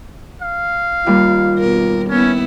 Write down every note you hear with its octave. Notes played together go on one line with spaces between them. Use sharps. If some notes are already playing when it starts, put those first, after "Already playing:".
F5
D#2 G3 A#3 F4
B2 A#4
B3 C#4 E4